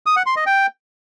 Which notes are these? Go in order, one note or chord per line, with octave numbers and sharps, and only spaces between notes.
D#6
F#5
C6
D#5
G5